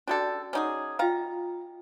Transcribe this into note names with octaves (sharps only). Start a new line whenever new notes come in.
C#4 D4 F#4 G4 A4 D5
C#4 D#4 G#4 F#5 C#6 D6
F4 D#5 F5 G5 A#5